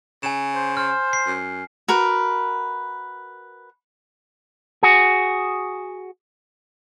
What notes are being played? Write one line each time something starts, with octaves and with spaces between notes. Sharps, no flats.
C#3 G#5 E7
C5
C5 F6
C7
F#2
F#4 A#4 B4
F#4 G#4